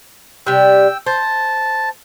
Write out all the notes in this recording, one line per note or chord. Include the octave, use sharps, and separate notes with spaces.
C3 G3 G5 E6
C5 A5